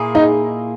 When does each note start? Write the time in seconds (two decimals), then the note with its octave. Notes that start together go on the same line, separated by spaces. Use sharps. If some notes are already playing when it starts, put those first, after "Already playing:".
Already playing: A#2 A#3 E4 G#4
0.15 D#4